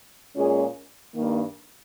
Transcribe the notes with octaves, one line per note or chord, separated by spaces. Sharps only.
A#2 G#3 C#4 F4 G#4
G2 D#3 A#3